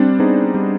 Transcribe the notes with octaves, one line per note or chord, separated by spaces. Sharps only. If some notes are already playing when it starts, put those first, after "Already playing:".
Already playing: G3 C4 D4
B3 D#4 G#4 C5
G3